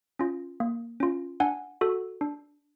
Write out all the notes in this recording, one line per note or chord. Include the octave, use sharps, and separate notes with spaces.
C#4 F4
A#3
C#4 F4
D4 F#5 G#5
F#4 A4
D4